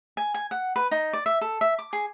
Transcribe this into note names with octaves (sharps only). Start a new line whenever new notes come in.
G#5
G#5
F#5
B4
D#4
D5
E5
A4
E5
D6
G#4